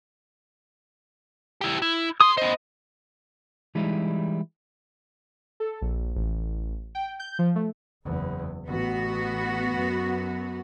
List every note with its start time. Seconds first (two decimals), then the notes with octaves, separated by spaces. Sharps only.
1.61 E4 G4
1.82 E4
2.20 G#4 C6 D#6
2.37 B3 C5 D#5
3.75 E3 G3 G#3 D#4 E4
5.60 A4
5.82 A#1
6.16 A1
6.95 G5
7.20 G6
7.39 F3
7.56 A3
8.04 F#1 E2
8.66 A1 B3 F#4
9.75 F#2